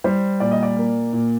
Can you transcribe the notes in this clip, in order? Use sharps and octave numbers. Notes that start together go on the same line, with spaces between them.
G3 C5
A#2 D5
D#5
D5
A#3
A#2